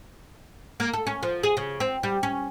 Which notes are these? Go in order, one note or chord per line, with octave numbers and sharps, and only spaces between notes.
A#3
A4
C#4
F3
G#4
C#3
C4
G3
C#4